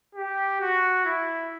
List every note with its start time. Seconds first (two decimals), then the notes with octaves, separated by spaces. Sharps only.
0.15 G4
0.61 F#4
1.06 E4